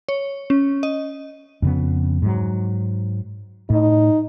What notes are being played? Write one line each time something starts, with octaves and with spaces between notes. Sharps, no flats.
C#5
C#4
D#5
F2 C#3 B3
G#2 F#3
A2 D#4